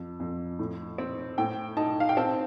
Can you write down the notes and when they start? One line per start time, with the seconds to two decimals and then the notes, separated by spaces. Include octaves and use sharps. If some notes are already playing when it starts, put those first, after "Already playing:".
Already playing: F2
0.20 F2
0.59 A2
0.98 C4
1.38 A2 G5
1.77 D#4 A5
2.00 F5
2.09 G5
2.17 C4 A5